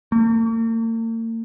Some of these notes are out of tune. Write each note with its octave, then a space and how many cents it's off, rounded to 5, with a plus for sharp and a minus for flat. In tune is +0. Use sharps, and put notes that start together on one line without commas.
A#3 -45